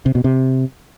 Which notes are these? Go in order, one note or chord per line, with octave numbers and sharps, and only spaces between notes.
C3
B2
C3